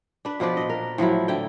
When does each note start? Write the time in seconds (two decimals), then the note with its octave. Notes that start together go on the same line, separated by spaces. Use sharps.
0.25 D4 B4
0.40 B2 F3 B4 D5
0.57 A#2 D#5
0.69 A#4
0.98 A2 F3 F#3 E4
1.28 D3 E4 G5